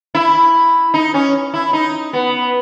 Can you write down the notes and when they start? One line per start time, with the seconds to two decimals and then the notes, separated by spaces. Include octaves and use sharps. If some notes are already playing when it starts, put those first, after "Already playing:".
0.15 E4
0.94 D#4
1.14 C#4
1.54 E4
1.73 D#4
2.13 B3